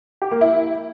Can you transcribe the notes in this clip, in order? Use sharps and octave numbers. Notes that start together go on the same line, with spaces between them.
G4
A#3
E4